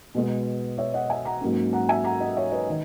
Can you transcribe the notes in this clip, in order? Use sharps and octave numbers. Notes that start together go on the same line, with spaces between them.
B2 G#3 B3
C#5 E5
D#5 F#5
E5 G#5
F#5 A#5
G#2 F#3 A#3 C#4
F#5 A#5
E5 G#5
F#5 A#5
D#5 F#5
C#5 E5
B4 D#5
D#3 B4